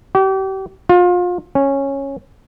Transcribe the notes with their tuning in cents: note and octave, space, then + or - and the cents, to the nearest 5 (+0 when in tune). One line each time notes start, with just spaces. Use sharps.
G4 -35
F4 +30
C#4 -10